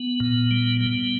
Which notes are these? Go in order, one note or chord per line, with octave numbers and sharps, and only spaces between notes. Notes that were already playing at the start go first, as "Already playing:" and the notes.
Already playing: B3
A#2
G3
G3